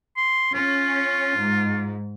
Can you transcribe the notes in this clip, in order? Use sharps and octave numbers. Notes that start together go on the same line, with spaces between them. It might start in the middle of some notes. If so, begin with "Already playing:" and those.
C6
C#4 F4
G#2